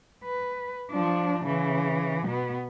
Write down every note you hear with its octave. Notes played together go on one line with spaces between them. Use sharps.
B4
F3 D4
C#3 E3
B2 B3